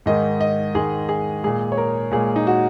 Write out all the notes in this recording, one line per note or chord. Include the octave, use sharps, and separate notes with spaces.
G#2 D#3 G#3 D#5
D#5
G#2 D#3 G#3 G#4
G#4
A#2 G#3 G#4
C#5
A#4
A#2 G#3 G#4
D#4
F#4